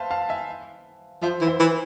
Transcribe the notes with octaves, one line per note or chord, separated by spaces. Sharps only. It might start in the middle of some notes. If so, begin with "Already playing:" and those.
Already playing: B4 C5 E5 F5 A5
F5 A5
E5 G#5
F3 C5 E5
E3
C5 E5
E3